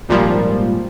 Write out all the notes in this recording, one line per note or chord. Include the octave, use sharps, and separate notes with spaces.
G#1 A#2 F3 G3